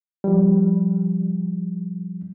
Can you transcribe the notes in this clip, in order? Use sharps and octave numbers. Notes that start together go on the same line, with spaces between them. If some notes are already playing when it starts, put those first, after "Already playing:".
F3 G3